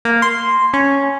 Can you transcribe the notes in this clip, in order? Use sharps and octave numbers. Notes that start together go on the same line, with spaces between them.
A#3
C6
C#4